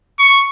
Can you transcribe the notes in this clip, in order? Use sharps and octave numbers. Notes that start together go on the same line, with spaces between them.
C#6